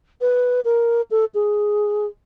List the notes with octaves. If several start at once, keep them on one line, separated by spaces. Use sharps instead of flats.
B4
A#4
A4
G#4